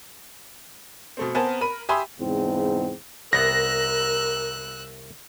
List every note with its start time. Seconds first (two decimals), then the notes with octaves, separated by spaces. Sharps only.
1.17 B2 A3 C4
1.35 B3 C4 A#4 C5 G#5 A5
1.61 A#4 B5 D#7
1.89 G4 E5 G#5 B5 C6 D#6
2.20 E2 G#2 C#3 C4
3.33 C2 B3 A#4 E6 F#6 A#6